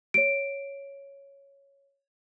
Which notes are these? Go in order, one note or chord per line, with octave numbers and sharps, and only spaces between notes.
C#5 D7